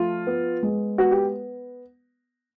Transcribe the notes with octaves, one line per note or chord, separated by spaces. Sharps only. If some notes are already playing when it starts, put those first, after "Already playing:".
Already playing: F3 A3 F4
B3
G#3
B3 F#4
G4